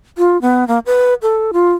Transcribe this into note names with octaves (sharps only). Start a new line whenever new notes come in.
F4
B3
A#3
B4
A4
F4